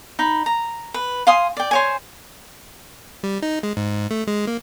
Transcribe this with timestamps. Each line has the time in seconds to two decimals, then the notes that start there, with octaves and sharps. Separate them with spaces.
0.19 D#4 B5
0.46 A#5
0.94 B4
1.27 F5 G#5 C6 D#6
1.57 D5 G5
1.71 C5 C#5 G#5
3.23 G3
3.42 D#4
3.63 G#3
3.77 G#2
4.11 A3
4.27 G#3
4.47 A#3